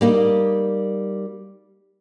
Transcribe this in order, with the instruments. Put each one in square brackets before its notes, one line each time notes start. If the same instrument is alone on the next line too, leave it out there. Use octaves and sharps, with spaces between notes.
[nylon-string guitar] G3 A#3 D#4